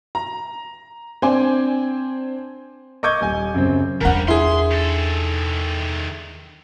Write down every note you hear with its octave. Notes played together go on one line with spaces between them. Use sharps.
A#5
C4 D4 C5 G#5 D6
D#5 C#6 D6 G6 G#6
D#1 G#5
F#2 C#3 C4
E2 G3 D4 A#4 F#5
E4 G#4 C6
D#3 A4